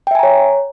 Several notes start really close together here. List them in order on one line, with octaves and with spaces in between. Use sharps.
G5 E5 G#5 A#5 C#5